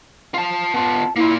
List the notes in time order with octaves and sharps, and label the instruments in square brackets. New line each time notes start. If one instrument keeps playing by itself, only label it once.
[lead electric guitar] F4 A5
[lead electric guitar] B3 F4 [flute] A5
[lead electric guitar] A#3 F4 [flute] E4